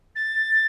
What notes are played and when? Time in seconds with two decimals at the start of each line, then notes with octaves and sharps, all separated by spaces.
0.15 A6